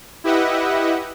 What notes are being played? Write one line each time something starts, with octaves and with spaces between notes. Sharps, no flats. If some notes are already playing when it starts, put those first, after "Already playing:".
E4 G4 B4 D#5 E5 F#5